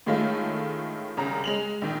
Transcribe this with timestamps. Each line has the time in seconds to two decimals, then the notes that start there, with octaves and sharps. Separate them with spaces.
0.06 A2 D#3 G#3 A3 C#4 F4
1.17 C2 C#3 A#5
1.44 G#3 F7 F#7
1.82 A#1 D#3